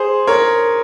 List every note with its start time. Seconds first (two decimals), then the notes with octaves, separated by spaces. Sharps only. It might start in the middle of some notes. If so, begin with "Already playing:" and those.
Already playing: G#4 C5
0.27 A#4 C#5